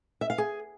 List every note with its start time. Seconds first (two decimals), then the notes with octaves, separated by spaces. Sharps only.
0.21 E5
0.30 F5
0.38 G#4